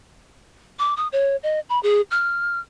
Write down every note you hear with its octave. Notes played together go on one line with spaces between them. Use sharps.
D6
D#6
C#5
D#5
B5
G#4
F6